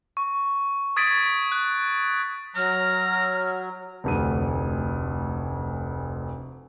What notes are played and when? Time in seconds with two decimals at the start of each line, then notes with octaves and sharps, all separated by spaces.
0.17 C#6
0.96 C#6 D#6 G#6 A6 B6 D7
1.52 F#6
2.56 F#3 A#5 F6
4.04 F1 D2 D#7